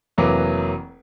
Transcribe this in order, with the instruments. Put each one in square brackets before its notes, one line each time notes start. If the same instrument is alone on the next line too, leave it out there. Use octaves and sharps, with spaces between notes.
[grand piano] F1 E3 F#3 A#3 B4 D6